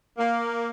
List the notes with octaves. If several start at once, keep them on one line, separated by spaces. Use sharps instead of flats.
A#3